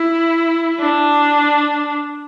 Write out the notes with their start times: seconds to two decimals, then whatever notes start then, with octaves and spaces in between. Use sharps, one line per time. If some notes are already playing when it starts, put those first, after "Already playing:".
Already playing: E4
0.81 D4